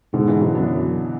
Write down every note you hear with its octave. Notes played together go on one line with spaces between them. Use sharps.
G#2 B2 D3
C#3 E3
D3 F#3
F#2 B3 D4